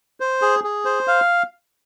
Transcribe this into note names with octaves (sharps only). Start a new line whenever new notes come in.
C5
G#4
G#4
C5
F5